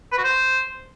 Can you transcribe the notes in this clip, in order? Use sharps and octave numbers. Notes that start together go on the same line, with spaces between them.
B4
F#4
C5